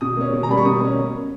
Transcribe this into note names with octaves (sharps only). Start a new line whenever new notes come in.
B2 D#6
A#3 C#4
B2
A#5
G3 A#3 B5
C#6
B2 D#6
A#3 C#4